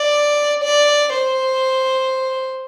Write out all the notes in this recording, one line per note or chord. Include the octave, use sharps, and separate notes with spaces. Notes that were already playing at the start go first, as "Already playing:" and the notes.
Already playing: D5
D5
C5